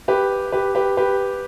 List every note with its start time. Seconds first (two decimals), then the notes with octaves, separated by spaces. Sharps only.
0.08 G4 B4
0.52 G4 B4
0.75 G4 B4
0.97 G4 B4